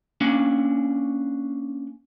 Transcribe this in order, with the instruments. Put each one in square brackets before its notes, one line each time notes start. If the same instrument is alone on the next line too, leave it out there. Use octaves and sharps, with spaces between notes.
[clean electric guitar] A#3 C#4 D4